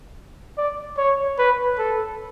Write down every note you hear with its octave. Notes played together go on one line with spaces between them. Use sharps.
D5
C#5
B4
A4